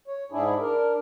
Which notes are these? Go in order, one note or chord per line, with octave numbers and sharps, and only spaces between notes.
C#5
G#2 D4 E4 G#4
D4 A#4